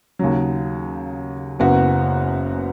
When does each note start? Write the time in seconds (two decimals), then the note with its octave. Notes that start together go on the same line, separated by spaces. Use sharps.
0.19 D#2 C#3 F#3
1.59 F#1 F#2 C#3 B3 F#4